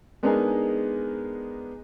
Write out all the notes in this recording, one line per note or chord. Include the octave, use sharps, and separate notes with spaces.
G#3 B3 D4 D#4 G#4 A#4